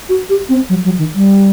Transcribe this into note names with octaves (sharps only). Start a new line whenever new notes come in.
F#4
G4
C4
F#3
F#3
D#3
G3